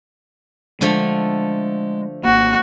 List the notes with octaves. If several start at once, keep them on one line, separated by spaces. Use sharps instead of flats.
D3 F3 G#3 A3
G#1 A#3 F#4